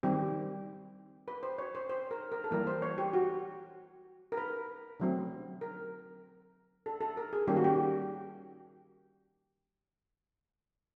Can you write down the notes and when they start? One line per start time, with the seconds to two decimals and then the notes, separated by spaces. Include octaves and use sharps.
0.03 D#3 G3 C4 G4
1.28 B4
1.43 C5
1.58 C#5
1.75 C5
1.90 C5
2.11 A#4
2.32 A#4
2.44 A4
2.51 E3 G3 A#3 A#4
2.67 C5
2.82 C#5
2.98 G4
3.13 F#4
4.32 A#4
4.37 B4
5.00 D3 F#3 A3 C4
5.61 A#4
6.86 A4
7.01 A4
7.17 A#4
7.33 G#4
7.48 D#3 G3 A#3 C#4 G4
7.56 F#4
7.64 G4